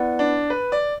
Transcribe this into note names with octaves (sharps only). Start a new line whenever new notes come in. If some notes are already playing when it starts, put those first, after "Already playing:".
Already playing: B3 E4 B4 D5 F#5
D4
B4
D5